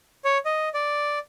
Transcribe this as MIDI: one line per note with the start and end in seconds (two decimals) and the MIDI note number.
0.25 0.38 73
0.45 0.69 75
0.74 1.19 74